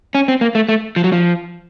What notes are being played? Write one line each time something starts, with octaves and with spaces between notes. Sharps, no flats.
C#4
C4
A#3
A3
A3
F3
F#3
F3